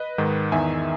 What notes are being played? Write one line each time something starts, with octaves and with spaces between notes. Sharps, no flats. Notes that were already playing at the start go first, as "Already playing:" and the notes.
Already playing: B4 D#5
G#2 D#3
E2 D#3 E5 G#5